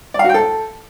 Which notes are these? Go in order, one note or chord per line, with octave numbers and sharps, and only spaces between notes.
D5
F5
F#4
G5
A4